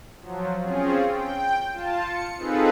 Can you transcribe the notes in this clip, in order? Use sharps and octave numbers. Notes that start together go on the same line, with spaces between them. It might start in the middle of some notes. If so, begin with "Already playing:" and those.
F3 F#3
C4 C#4 F4 G#4
G5
F4 A5
C#7
C4 D#4 F4 G#4 A4 B4